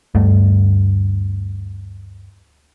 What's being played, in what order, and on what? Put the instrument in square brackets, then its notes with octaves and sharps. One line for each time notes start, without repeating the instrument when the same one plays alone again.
[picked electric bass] D2 G2 A3